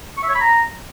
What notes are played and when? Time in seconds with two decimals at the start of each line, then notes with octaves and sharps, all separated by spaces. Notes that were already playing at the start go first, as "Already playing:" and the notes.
0.17 C#6
0.23 E5
0.29 C#5
0.35 B5
0.41 A#5